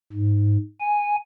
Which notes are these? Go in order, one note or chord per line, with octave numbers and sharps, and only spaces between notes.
G#2
G#5